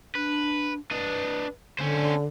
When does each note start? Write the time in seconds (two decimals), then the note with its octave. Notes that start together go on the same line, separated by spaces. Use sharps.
0.15 D4 B4
0.91 D4 B4 D#5
1.79 D3 C#4 C5